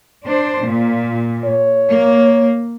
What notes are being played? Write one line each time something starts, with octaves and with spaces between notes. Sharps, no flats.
D4 C5
A#2
C#5
A#3